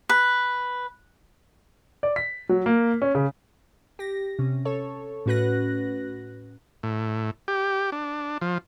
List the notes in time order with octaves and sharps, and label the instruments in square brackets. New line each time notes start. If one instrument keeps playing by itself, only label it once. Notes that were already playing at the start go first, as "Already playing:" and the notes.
[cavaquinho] B4
[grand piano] D5
B6
F#3
A#3
C#4
C#3
[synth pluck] G4 A#6
C3 C#4
A4 C#5
A2 C#4 F#4 B4 F#6 A#6
[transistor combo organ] A2
G4
D4
F3